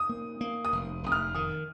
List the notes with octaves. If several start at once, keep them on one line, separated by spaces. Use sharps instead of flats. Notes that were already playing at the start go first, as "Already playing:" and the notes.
Already playing: D#6
A#3
A#3
D#6
F1
F1 D#6
F6
D#3 D#6